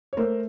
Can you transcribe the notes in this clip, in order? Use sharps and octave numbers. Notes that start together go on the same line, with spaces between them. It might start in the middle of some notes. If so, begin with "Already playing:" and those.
C#5
A3 A#4 C5